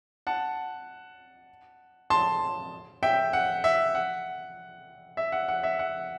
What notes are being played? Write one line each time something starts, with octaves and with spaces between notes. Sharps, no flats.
F#5 A5
A5 C6
E5 G5
F#5
E5
F#5
E5
F#5
F#5
E5
F#5